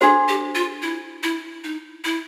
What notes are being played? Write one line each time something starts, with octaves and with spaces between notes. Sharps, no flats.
D4 F#4 G#4 A4 C5
G4
F4
E4
E4
D#4
E4